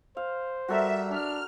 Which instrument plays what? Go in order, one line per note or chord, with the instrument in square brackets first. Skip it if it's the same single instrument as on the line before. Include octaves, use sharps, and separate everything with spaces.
[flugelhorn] C5 [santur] F5
[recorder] G3 [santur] F#4 A4 A#4 [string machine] E5
[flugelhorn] D4 [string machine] F6